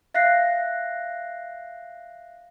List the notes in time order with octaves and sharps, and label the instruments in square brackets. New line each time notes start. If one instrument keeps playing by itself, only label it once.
[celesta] E5 F5 F#6 A#6 C7